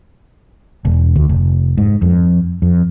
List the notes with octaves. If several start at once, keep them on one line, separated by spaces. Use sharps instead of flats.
E1
D2
F1
G#2
F2
F2